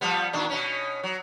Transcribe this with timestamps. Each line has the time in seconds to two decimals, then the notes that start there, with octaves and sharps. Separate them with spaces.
0.01 F3 G3 B3
0.33 A#2 D#3 D4
0.50 B2 C#4
1.03 F#3